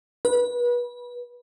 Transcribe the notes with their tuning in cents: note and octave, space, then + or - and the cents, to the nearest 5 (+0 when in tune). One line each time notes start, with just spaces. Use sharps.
B4 -25